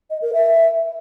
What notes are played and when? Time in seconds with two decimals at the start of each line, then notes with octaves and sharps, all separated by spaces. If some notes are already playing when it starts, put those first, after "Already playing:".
0.10 D#5
0.22 A#4
0.33 E5